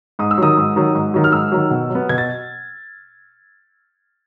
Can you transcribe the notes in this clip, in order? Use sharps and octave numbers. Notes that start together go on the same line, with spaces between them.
G#2 D#6
E6
D#3 F#3 D#6
G#2
D#3 F#3
G#2
D#3 F#3
F6
G#2 E6
D#3 F#3
B2
F#3
B3
B2 G#6
A6